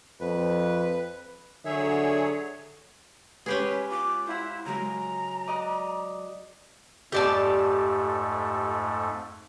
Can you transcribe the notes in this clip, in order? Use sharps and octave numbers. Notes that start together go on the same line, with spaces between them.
F2 B4
D3 F#3 G#4 C#5 E5
G#3 C#4 G4 G#4 B4
F4 D6 F#6
E4 C5 F5 F#5
C#3 F#3 G#3 A#5
D5 D#5 F#5
F2 G#2 A3 G4 D5 A5